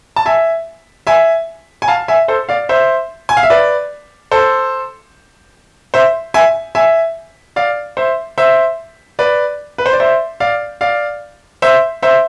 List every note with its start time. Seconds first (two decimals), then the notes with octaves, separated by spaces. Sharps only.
0.16 A5
0.26 E5 G#5
1.07 E5 G#5
1.82 G#5
1.88 F5 A5
2.08 E5 G#5
2.28 A4 C5
2.49 D5 F5
2.69 C5 E5
3.29 G#5
3.37 F5
3.43 E5
3.50 B4 D5
4.31 A4 C5
5.94 C5 E5
6.34 E5 G#5
6.75 E5 G#5
7.56 D5 F5
7.97 C5 E5
8.38 C5 E5
9.19 B4 D5
9.78 B4
9.86 C5
9.93 D5
10.00 C5 E5
10.40 D5 F5
10.81 D5 F5
11.62 C5 E5
12.03 C5 E5